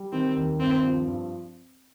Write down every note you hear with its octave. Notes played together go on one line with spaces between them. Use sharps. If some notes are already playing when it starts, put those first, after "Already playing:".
Already playing: G3
D#3 C4
D#2
G2 C4
F3
G2